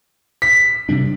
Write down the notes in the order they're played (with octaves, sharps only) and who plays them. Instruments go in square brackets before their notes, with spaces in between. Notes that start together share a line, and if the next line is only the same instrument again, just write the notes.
[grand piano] B6
[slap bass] C3 G3 D4